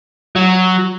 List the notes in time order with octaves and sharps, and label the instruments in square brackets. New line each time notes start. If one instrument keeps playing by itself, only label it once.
[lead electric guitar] F#3